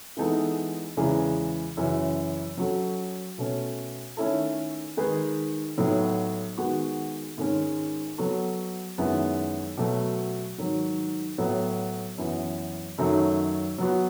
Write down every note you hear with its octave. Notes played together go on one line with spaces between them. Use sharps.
E3 G#3 B3 D#4 A4
E2 C#3 E3 G#3
F#2 C#3 E3
F#3 C#4 F#4 A4
B2 A3 C#4
D#3 A3 C#4 E4 A4
D#3 G#3 D#4 G#4 B4
A2 F#3 B3 D#4
D#3 G#3 B3 F#4
G#2 D#3 G#3 C#4
F#3 B3 F#4 A4
F#2 D#3 G#3 B3 E4
B2 F#3 A3
G#2 D#3 F#3
A2 F#3 B3
F#2 E3 B3
F#2 D#3 F#3 A3 D#4
F#3 B3 F#4